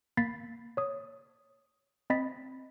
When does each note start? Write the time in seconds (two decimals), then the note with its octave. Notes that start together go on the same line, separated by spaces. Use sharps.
0.17 A#3 B5 A6 B6 C7
0.77 C#5 D#6
2.10 C4 D#5 B5 A6 B6